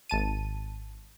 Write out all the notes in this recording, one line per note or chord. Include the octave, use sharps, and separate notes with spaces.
G#1 A5 D#7